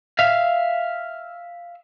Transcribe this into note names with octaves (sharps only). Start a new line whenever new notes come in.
E5 F5